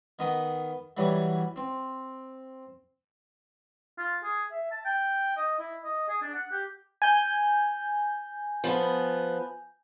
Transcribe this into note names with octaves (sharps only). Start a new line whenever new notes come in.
D#3 B3 D#5
E3 F#3 G3
C4
F4
G#4
E5
A5
G5
D#5
E4
D#5
G#4
D4
F#5
G4
G#5 G6
F3 B3